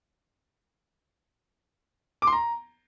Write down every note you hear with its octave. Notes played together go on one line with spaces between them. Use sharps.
D6
C6
A#5